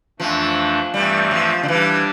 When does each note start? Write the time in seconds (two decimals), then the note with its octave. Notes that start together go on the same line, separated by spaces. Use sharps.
0.19 F2 E3 F3 A3 D4
0.93 G2 E3 G3 A3 C4
1.31 F3
1.63 D3
1.68 E3 G3 D4 G4